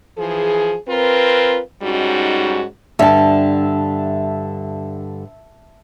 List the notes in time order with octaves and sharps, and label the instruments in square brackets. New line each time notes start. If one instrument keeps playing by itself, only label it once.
[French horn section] E3 F3 G#4
C4 F4 A#4 B4
G#2 G3 C#4 D#4 F#4
[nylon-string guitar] G2 D3 [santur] E5 A5